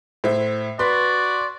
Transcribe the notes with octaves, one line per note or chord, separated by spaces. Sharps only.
A2 C5 E5
F#4 B4 D5 C6 B6